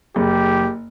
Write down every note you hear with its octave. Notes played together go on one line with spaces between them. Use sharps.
F#1 G4